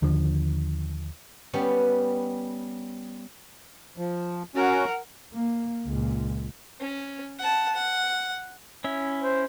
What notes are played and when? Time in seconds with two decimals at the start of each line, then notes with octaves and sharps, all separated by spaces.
0.02 D#2 D3 F3
1.53 G3 B3 C#4
3.97 F3
4.56 C#4 F#4 A#4 F#5
5.33 A#3
5.85 C#2 A#2
6.80 C#4
7.39 F#5 A5
7.75 F#5
8.84 C#4 E4 E5
9.21 C5